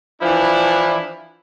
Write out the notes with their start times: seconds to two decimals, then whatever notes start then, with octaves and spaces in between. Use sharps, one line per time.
0.22 E3 F3 D4 E4